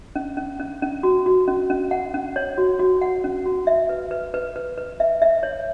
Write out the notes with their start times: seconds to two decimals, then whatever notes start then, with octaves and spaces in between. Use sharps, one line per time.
0.16 C#4
0.37 C#4
0.60 C#4
0.82 C#4
1.03 F#4
1.26 F#4
1.48 C#4
1.70 C#4
1.91 F#5
2.14 C#4
2.36 C#5
2.58 F#4
2.79 F#4
3.01 F#5
3.24 C#4
3.46 F#4
3.67 E5
3.89 B4
4.11 B4
4.34 B4
4.56 B4
4.77 B4
5.00 E5
5.22 E5
5.43 C#5